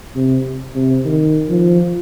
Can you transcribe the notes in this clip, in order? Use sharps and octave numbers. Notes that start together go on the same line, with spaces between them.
C3
C3
D#3
F3